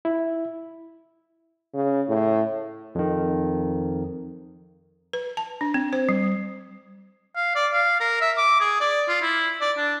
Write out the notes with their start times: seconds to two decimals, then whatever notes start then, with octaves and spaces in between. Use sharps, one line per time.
0.05 E4
1.74 C#3
2.08 A2
2.95 F2 D#3
5.13 B4
5.37 A5
5.61 D4
5.74 C4
5.93 C5
6.09 G3
7.36 F5
7.55 D5
7.72 F5
8.00 A#4
8.21 E5
8.37 D6
8.60 G#4
8.80 D5
9.08 F4
9.22 E4
9.61 D5
9.77 D4